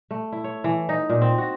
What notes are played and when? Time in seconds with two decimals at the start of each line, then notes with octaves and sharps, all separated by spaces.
0.11 A3
0.32 E4
0.44 C#5
0.64 E3
0.89 D#4
1.09 A#2
1.22 C4
1.38 F#4